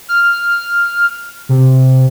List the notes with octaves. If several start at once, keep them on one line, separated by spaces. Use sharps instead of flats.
F6
C3